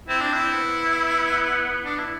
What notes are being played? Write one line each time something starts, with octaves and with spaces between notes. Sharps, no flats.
C4 E4
D4
E4
C4
B3
D4
E4